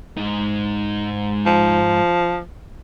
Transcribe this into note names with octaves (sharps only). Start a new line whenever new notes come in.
G#2 D#4
F3